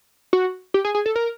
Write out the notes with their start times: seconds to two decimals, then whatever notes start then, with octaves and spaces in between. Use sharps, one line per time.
0.33 F#4
0.74 G4
0.85 G#4
0.95 G#4
1.06 A4
1.16 A#4